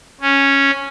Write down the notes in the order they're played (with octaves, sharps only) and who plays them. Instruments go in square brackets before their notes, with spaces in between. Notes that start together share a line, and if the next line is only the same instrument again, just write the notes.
[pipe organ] C#4